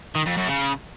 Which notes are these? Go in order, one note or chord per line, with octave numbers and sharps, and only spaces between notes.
D#3
F2
F#2
C#3